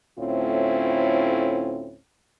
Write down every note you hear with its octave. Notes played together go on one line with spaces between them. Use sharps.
D2 A2 C4 C#4 E4 F4